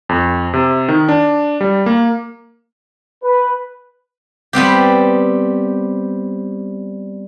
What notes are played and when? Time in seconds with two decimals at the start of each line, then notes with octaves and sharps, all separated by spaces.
0.09 F2
0.54 C3
0.88 D#3
1.09 D4
1.61 G3
1.86 A#3
3.22 B4
4.53 G3 B3 C4 G4